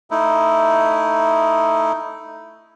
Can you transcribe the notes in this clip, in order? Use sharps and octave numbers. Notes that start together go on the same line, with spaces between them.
A3 D#4 E4